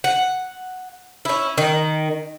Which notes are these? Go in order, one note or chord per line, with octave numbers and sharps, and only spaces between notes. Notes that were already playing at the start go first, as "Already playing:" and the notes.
F#5
C#4 E4
D#3